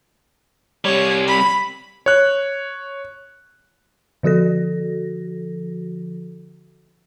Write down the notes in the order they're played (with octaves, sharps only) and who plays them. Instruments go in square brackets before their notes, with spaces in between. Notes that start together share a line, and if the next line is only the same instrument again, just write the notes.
[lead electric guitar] C3 G3 [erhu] C#5
[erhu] B5
[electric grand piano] C#5 F#6
[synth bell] D3 F3 F#4 A4 A#6